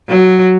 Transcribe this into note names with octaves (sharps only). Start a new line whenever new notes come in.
F#3